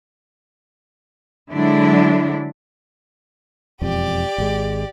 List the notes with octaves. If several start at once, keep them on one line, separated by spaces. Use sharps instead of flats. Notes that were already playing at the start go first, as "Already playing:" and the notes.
D3 F#3 G#3 D4 E4
E1 F2 G4 D5
G#1 G#3